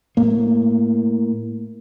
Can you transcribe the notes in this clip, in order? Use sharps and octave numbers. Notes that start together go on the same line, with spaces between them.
A2 A#3